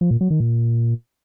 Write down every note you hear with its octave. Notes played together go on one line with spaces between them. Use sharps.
F3
A#2
F#3
D#3
A#2